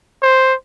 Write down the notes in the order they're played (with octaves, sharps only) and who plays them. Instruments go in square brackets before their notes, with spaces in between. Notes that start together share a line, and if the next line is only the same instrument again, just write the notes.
[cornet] C5